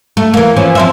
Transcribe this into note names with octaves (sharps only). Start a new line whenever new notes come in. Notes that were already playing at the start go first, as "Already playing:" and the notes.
A3
E3 A#3
E3 F3 C#4
F3 C4 E5